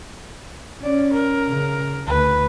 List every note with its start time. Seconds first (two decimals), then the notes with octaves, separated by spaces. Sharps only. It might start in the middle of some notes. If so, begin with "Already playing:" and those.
0.83 C#4 D5
1.13 A#4
1.48 C#3
2.07 D2 B4